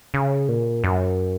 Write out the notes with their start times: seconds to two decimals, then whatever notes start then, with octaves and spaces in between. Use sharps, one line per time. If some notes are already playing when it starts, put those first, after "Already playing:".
0.14 C#3
0.49 A#2
0.84 F#2